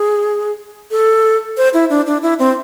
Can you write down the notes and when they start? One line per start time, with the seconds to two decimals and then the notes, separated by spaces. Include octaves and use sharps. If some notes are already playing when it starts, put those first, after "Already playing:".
Already playing: G#4
0.91 A4
1.57 C5
1.74 E4
1.90 D4
2.06 D4
2.23 E4
2.39 C4